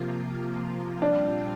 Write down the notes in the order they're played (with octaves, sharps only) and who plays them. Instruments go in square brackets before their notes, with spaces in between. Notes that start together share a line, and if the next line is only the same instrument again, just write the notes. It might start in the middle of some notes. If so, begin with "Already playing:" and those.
Already playing: [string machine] C3 F3 A#3 F4
[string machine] A#2 G3 C4 F4 [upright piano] D4